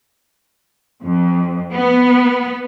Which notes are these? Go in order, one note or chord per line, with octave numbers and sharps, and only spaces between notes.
F2
B3